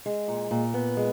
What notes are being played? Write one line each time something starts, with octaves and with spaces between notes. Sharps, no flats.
G#3
A#2
A#2
B3
G#3